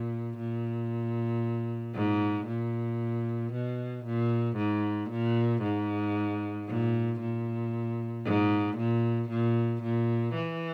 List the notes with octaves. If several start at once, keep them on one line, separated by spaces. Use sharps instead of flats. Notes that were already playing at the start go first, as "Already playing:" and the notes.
Already playing: A#2
A#2
G#2
A#2
B2
A#2
G#2
A#2
G#2
A#2
A#2
G#2
A#2
A#2
A#2
E3